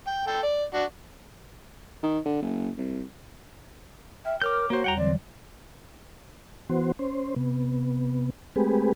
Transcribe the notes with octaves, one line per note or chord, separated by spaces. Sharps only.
G5
A4 G5
D5
D4 F#4
D#3
D3
F#1
C2
E5 G5 F6
A#4 C#5 D6 F6 G6
A#3 F#4 C5 C#5
E2 G3 F#5 G5 A#5
D3 E3 F#3 C4 D5
E3 B3 F#4 C5
C#4 C5
C3 B3
G#3 A3 C4 G4 G#4 B4